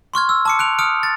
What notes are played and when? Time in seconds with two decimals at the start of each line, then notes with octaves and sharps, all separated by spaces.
0.14 C6 C#6 F6 G#6
0.29 E6
0.45 A5 D6 C#7
0.59 F#6 D7 F7
0.79 D#6 F6 C#7 D7
1.03 A6